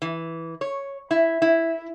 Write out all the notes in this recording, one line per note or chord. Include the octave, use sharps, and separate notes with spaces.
E3
C#5
E4
E4